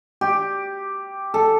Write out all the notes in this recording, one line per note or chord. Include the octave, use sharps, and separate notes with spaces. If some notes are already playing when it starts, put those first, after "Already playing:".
G4
A4